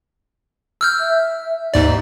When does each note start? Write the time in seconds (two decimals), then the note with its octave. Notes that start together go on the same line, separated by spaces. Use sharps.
0.81 E6 F6 G6
1.00 E5
1.74 D#2 G#2 D#4 D5